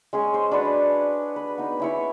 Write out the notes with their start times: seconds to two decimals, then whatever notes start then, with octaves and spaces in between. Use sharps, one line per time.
0.13 G#3 C#4 G#4
0.34 C5
0.51 D4 F#4 B4 C#5
1.36 B4
1.58 B3 D#4
1.80 C#4 E4 C#5